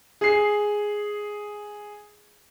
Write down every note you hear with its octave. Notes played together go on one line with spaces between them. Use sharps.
G#4 C7